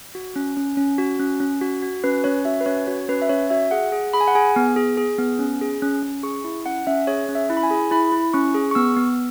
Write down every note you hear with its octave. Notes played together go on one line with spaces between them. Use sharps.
F#4
C#4
C#4
C#4
F#4
C#4
C#4
F#4
F#4
C#4 B4
C#4 C#5
F#4 E5
B4
C#4 C#5
F#4 C#5
C#4 B4
E5
C#4 C#5
F#4 E5
G#4 F#5
G#4
G#4 B5
G#5
F#5
G#4 G#5
B3
G#4
G#4
B3
C#4
G#4
C#4
C#4
G#4 C#6
E4
C#4 F#5
C#4 E5
G#4 C#5
C#4
E5
E4
B5
G#5
G#4
E4 B5
E4
C#4 C#6
G#4
C#6
B3 E6
B3